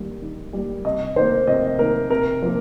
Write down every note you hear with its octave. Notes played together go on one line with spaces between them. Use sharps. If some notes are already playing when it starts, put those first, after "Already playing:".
Already playing: D#3 G3 A#3
D#3
G3 A#3
C3 D#5
D#3 A#3 C5
C3 D#5
D#3 A#3 A#4
C3 A#4
F3 A#3